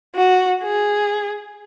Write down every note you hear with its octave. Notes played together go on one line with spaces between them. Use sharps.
F#4
G#4